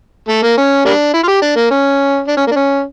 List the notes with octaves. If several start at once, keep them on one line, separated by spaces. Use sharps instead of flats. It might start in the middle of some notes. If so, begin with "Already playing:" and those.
A3
A#3
C#4
G3 A#3 D4
E4
F4
G4
D4
A#3
C#4
D4
C#4
A#3
D4
C#4